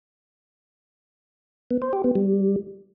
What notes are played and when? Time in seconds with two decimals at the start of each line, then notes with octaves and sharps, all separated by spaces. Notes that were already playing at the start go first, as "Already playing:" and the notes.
1.71 B3
1.82 C5
1.93 G4
2.04 B3
2.15 G3